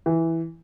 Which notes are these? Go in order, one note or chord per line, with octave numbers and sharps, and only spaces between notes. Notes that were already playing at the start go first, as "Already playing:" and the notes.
E3